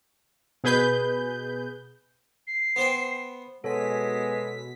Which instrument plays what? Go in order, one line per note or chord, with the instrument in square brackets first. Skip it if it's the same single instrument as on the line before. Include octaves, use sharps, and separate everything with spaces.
[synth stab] B2 G#4 B4 G6
[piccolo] C7
[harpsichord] B3 C5 G5
[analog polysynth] B2 B6 [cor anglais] G#3 [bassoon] B3 [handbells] A4 C#5 G#5